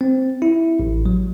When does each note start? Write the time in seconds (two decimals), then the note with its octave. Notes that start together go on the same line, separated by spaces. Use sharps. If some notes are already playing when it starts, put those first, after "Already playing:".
0.01 C4
0.42 E4
0.79 A1
1.06 F#3